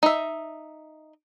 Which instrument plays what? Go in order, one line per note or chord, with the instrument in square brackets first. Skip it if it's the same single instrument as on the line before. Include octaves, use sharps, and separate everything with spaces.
[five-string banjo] D#4 E5